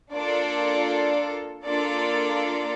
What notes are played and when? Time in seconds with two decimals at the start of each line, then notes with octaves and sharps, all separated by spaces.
0.12 A#3 D4 F4 A4 D5
1.64 A#3 D4 F4 A4 D5